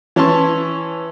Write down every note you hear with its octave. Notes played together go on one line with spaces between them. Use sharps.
E3 C#4 A5 C6 C#6